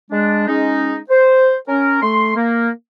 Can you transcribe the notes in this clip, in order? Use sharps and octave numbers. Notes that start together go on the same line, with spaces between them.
G#3 D4
G#3 C#4 D#4
C5
C#4 A#4
A3 C6
A#3